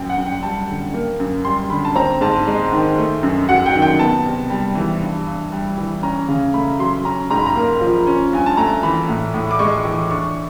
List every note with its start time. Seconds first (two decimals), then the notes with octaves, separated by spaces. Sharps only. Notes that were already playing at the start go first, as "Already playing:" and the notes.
Already playing: F#2 G5
0.09 F#5
0.18 F#2
0.26 G5
0.43 G3 A5
0.69 D3
0.94 A#3
1.20 F#2
1.45 G3 C6
1.70 D3 B5
1.85 A5
1.96 C4 A#5
2.21 G#2 A5
2.47 G#3
2.72 D#3
2.98 A3
3.23 F#2
3.49 F#3 F#5
3.66 G5
3.74 D#3
3.82 G5
3.99 B3 A5
4.25 C3
4.50 G3
4.75 E3
5.01 G2
5.27 G2
5.52 G3
5.78 E3
6.03 C#4 A#5
6.28 C#3
6.54 A3 B5
6.79 F#3 C6
7.05 C#4 A#5
7.30 G#2 A#5
7.38 B5
7.46 A#5
7.56 A#3
7.81 F3
8.07 C#4
8.33 G2 G#5
8.46 A5
8.57 A3 A#5
8.83 E3 B5
9.09 A2
9.34 A2
9.51 D6
9.59 G#3 C#6
9.85 E3
10.10 D4 C#6